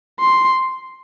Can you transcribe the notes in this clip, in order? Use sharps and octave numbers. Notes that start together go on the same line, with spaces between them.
C6